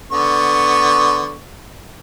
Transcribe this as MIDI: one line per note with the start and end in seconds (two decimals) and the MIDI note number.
0.11 1.35 50
0.11 1.35 59
0.11 1.35 85